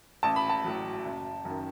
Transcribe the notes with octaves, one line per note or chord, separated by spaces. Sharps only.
A1 A5
B5
A5
A2 F#3
F#1
F#2 D#3